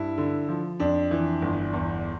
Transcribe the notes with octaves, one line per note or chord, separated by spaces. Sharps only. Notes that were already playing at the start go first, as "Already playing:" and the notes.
Already playing: G2 E4
D3
F3
F2 D4
E3
G1
E2